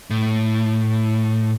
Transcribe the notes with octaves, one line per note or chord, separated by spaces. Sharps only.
A2